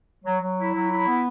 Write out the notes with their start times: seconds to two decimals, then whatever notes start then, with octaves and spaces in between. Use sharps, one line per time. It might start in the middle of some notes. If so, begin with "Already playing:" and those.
0.25 F#3
0.41 F#3
0.57 E4
0.74 F#3
0.91 E4
1.07 B3